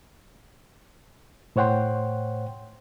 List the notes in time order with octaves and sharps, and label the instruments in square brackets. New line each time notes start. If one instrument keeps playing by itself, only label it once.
[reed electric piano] A2 C5 C#5 F#5 G5 C6